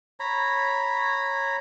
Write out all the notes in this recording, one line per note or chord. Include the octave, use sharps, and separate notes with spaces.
C#5 A#5 B5